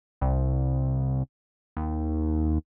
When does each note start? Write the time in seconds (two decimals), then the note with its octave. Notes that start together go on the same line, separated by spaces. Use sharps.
0.21 C2
1.77 D#2